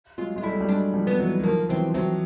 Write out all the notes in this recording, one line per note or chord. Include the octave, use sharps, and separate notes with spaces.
F#3 G#3 F4
G#3 F4
G3 A3 E4
F#3
G3
F#3 G#3 D4
F3 G3
B3
E3 F#3
F#3
D#3 F3 A#3
E3 F#3 C4
E3 F#3 C4